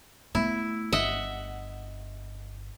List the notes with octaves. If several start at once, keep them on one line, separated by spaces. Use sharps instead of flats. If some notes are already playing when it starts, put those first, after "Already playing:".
A3 B3 E4
G1 D#5 E5 F#5